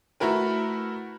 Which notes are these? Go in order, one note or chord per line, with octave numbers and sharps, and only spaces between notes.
A3 E4 F#4 A#4 B4